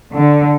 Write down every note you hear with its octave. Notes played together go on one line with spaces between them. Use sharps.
D3